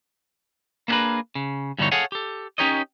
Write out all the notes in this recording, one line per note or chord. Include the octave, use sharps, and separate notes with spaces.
A#3 B3 D4 G#4 A#4 B4
C#3
G2 B2 D3 E3 D#4 C#5
G#4 A4 C#5 F5 F#5 G#5
G4 A4
C#4 D#4 G4 A#4 C#5 D#5